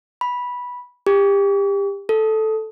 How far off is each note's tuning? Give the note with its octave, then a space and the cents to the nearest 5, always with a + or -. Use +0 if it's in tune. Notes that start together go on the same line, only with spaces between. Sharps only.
B5 -10
G4 +30
A4 -5